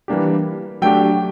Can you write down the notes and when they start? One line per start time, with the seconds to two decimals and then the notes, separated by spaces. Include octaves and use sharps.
0.08 E3 G3 A#3 D4 G4
0.82 F#3 A3 D4 G4 G5